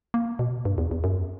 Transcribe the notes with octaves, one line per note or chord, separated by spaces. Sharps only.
A#3
B2
G2
E2
E2
F#2